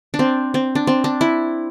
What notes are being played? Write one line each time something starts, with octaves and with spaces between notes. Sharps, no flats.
D4
C4
C4
D4
C4
D4
E4